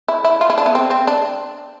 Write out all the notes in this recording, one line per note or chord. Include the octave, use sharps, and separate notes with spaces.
E4
E4
F4
E4
D4
B3
C4
C4
D4